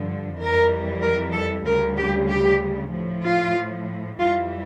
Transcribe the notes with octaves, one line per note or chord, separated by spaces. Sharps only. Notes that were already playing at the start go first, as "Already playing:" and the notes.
Already playing: G2 D3 F3
F2 E3 G3 A#4
A#4
A4
D2 C#3 G3 A#4
G4
G4
A2 F3
F4
F2 E3 G3 F4